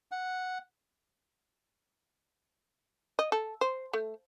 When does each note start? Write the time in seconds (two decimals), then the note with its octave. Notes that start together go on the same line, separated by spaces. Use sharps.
0.11 F#5
3.19 D#5
3.32 A4
3.61 C5
3.93 A3